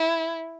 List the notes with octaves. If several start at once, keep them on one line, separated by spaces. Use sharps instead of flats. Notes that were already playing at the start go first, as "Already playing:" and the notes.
Already playing: E4